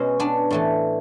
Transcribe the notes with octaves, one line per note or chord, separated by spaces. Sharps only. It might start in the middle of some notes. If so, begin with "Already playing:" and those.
Already playing: B2 G#3 C#4
B3 D4
A2 E3 A3